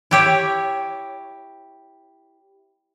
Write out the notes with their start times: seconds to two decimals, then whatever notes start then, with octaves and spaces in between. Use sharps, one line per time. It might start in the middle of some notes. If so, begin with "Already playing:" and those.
0.11 E4 G4 C#5